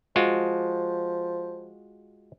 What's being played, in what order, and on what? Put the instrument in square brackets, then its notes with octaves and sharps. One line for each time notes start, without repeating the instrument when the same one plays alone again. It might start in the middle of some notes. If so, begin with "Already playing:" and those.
[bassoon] F3 [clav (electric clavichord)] G#3 F4 F#4